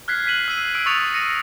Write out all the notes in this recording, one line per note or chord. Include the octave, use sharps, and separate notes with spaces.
F6 F#6 G#6 B6 C7
B6 D#7 F#7
E6 C7 D#7
E6 D7
C#6 D#6 E6 A6 C#7 F7
A#6 C#7 D#7